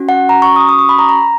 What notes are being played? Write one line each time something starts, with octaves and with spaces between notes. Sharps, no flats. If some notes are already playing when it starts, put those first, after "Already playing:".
Already playing: C#4 F#4
F#5
A#5
C#6
D#6
D#6
C#6
B5
A#5
A#5